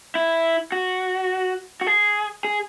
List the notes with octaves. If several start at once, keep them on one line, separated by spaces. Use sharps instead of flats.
E4
F#4
F#4
G#4
G#4